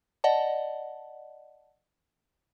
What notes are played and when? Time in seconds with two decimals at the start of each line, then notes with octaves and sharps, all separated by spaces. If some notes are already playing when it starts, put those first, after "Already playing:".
0.24 D5 D#5 F#5 A5